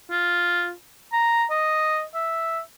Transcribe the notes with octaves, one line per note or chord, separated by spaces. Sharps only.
F4
A#5
D#5
E5